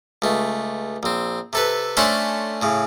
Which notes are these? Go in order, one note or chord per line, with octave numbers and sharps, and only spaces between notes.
C#2 A3
A#1 C4
C3 A4 B4
A3 C#4 D4 A4 C5 B5
A2 C#3